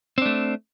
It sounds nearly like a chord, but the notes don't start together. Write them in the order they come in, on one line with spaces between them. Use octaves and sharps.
C4 D4 A3